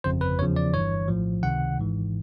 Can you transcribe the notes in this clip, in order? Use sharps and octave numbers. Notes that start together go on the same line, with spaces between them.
G1 F2 C#3 C5
B4
E2 C#3 F3 C#5
D5
G1 G2 E3 C#5
A#1 A2 F3
C#2 C3 D#3 F#5
G#1 G#2 E3